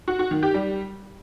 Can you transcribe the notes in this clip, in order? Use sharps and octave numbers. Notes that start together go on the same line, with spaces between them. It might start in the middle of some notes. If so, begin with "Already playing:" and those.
F#4
F#4
D#3
G4
G3